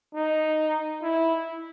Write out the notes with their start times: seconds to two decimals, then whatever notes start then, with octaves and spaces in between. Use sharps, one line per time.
0.15 D#4
1.03 E4